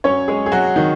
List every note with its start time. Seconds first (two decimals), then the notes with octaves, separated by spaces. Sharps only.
0.04 F#2 F#3 C#4 C#5
0.28 G#3 G#4
0.46 G#4
0.52 F#3 F#4
0.76 D#3 F#3 D#4